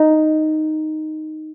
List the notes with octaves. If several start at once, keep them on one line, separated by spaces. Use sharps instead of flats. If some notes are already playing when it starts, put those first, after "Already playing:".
Already playing: D#4